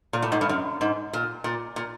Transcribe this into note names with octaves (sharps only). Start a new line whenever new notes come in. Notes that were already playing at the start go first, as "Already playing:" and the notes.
A#2
A2
G#2
G2
F#2
G#2
A#2
A#2
A#2